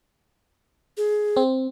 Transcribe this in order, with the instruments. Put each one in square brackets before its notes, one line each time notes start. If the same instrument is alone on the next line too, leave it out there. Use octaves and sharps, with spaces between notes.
[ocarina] G#4
[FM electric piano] C4